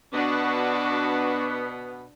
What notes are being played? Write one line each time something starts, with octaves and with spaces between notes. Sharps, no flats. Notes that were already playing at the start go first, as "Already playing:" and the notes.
B2 B3 D4 F#4